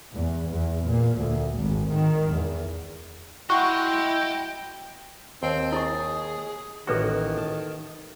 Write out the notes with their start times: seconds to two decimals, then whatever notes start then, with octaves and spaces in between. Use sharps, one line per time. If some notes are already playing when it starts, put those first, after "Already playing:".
0.11 E2
0.49 E2
0.86 A#2
1.17 D2
1.55 G#1
1.91 D#3
2.30 E2
3.50 E4 F#4 D#5 G5 C6
5.43 D#2 C4
5.72 E4 G#4 D#5 C#6
6.87 A1 D#3 A#3 F#4 A4 B4 C#6
7.38 A5